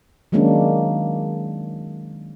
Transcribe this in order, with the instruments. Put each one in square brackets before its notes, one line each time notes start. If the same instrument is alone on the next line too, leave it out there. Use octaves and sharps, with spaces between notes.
[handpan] D#3 F#3 G#3 A#3 C#4 D4